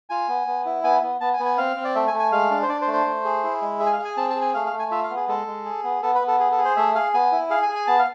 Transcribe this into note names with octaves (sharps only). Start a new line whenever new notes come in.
F4 G#5
B3
B3
E4
B3 G#5
B3
B3 A5
G#5
B3
G#5
C4 F5
C4
D5
A3 E5
G#5
A3
G#5
G#3 F5
D4
C5
D4 D5
C5
A3
C5
A3
G#4
E4
G#3
G#4 E5
G#5
F5
G#4
G#5
C4 A5
A5
G#4
G#5
A3 F5
F5
A3
G#5
F4 E5
F5
B3
G#4
G#3 A4
G#3
G#4
B3
B3 A4
B4
B3
A4
G#4
A4
G#4
C5
A3 E5
G#4 F5
B3 G#5
E4
G#4 F5
G#5
G#4
G#5
B3 A5
F5